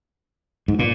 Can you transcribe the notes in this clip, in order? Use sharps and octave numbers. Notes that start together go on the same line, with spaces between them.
G#2
A#2